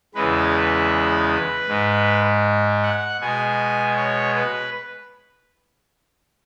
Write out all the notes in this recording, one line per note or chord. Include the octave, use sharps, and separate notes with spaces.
E2 C#3 E3 G#3 B4
G#2 G#3
F#5
B2 G#3 G#5
C#5
B4